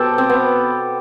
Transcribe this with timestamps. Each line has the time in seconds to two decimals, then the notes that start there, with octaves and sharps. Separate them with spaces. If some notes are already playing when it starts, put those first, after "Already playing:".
Already playing: B2 F#3 G4 A4 C5
0.18 C4
0.30 B3